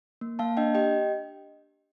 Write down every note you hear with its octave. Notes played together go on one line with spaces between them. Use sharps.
A#3
A#3 F5 A5
D4 D#5 G5
G4 D#5 G5